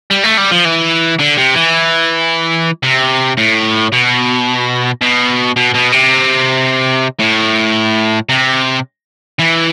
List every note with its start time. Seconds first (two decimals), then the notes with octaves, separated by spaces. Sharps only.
0.10 G3
0.23 A3
0.37 G3
0.51 F3
0.65 E3
1.19 D3
1.37 C3
1.55 E3
2.83 C3
3.38 A2
3.92 B2
5.02 B2
5.57 B2
5.74 B2
5.92 C3
7.20 A2
8.29 C3
9.39 E3